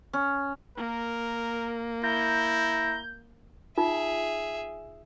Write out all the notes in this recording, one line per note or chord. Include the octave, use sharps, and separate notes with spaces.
C#4
A#3 A#4
E4 A#5 G6
D#4 F4 G#4 E5